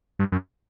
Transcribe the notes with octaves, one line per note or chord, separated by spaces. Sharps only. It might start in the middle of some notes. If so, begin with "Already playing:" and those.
G2
F#2